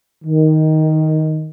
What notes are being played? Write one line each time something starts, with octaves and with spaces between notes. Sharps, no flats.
D#3